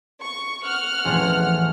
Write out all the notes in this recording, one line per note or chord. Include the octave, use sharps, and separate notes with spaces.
C#6
F#5 F6
E1 A1 F3